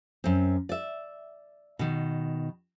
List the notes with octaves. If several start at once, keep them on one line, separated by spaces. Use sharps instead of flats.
F#2 C4
D5 E5
B2 D#3